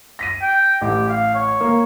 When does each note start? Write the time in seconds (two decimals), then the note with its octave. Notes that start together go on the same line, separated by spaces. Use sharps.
0.19 A#6 B6 D#7
0.42 G5
0.81 A1 G4
1.09 F5
1.34 C#5
1.61 A#3